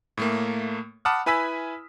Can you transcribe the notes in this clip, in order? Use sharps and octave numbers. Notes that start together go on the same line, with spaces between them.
A2 A3 A#3
F#5 A5 B5 D6 D#6 F6
E4 B4 G#5 B5 E6 B6